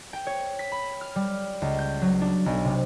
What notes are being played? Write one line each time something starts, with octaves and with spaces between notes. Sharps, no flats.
G5
C#5
B6
B5
F6
G3
C#2
G6
F#3
D4
B1
C3